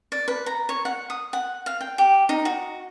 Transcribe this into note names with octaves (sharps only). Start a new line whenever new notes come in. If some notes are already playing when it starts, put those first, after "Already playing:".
D5
B4
A#5
C#5
F#5
D#6
F#5
F5
G5
G4
D#4
F#4